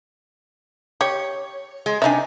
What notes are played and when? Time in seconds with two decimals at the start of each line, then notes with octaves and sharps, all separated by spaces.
1.01 G4 C#5
1.86 G#3
2.02 C3 D4 D#4 E5 G#5